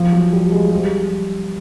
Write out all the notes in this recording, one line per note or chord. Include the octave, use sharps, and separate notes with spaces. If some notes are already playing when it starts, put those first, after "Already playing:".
Already playing: F3
F#3
G3
G#3
G3